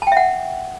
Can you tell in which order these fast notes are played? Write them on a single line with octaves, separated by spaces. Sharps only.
A5 G5 E5 F#5